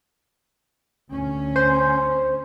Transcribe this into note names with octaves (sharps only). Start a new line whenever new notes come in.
D2 C#4
C5